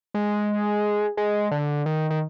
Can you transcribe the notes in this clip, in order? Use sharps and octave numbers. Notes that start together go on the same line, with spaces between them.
G#3
G#3
D3
D#3
D#3